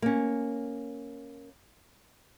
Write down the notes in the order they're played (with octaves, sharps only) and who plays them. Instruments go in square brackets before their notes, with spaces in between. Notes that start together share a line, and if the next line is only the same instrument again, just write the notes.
[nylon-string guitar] A#3 C#4